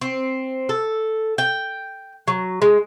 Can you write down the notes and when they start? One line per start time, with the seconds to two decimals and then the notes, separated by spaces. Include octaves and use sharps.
0.01 C4
0.69 A4
1.38 G5
2.28 F#3
2.62 G#3